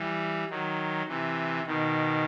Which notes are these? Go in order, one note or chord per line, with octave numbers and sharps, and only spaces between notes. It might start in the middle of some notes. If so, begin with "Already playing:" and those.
Already playing: E3 G3
D#3 F#3
C3 E3
B2 D#3